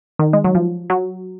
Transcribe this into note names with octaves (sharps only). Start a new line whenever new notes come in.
D#3
G#3
F#3
F3
F#3